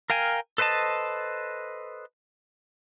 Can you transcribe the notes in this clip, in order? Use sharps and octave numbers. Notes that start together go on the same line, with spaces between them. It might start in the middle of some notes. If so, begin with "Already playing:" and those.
A#4 F5 G5 G#5
A4 B4 C5 D#5 A5